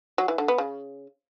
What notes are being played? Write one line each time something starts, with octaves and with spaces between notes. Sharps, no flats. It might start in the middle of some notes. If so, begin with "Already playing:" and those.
F#3
E3
D3
B3
C#3